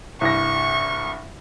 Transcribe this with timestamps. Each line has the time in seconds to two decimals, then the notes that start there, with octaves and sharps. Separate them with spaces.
0.21 C2 G2 C#6 A#6